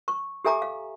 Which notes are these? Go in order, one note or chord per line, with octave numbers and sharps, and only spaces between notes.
C#6
G4 A4 E5 G#5 A#5 D6
F5